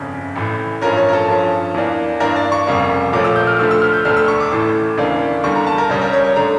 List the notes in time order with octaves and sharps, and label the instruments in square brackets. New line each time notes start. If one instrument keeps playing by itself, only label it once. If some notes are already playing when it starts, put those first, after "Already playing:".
Already playing: [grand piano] G1 F2 C#3
A1 A2 E3
A1 G2 F3 C#4 A#4
C#5
A#4
A4
G2 F3 C#4
E2 E3 A#3 D4
G2 E3 A#3 D4 A#4
D5
C#6
F1 F2 C#3 G3 A#3
A#1 A#2 F3 A3 C#4 D6
E6
G6
F6
D2 D3 F3 A3 E6
E6
F6
G6
E1 D2 D3 A3 D4 F6
E6
C#6
D6
A1 A2 E3 A3 D6
D2 C#3 E3 A#3 D4
E2 D3 G3 A#3 C#6
A#5
A5
A#4
C#2 C#3 G3 C#4
A#4
C#5
C#5
D3 A3 D4 A#5